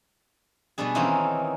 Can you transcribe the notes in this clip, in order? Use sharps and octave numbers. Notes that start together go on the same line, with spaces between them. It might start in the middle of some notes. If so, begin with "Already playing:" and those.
B2 G3 B3 D4 G#4
D#3 E3 A#3 C4 C#4 D#4